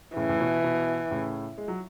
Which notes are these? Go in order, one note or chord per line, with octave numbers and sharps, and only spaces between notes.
A2 C#3 E3
A2
B2
B2
A2 C#3
G#3
F#3